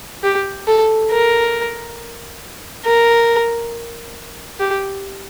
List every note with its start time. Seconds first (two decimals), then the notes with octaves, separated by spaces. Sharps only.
0.24 G4
0.67 A4
1.11 A#4
2.85 A#4
4.60 G4